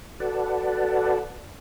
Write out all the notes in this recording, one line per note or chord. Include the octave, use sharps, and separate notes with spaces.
F#4 A4 B4 D5 F#5 A5